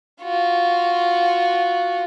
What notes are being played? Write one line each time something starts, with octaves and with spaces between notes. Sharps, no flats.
F4 F#4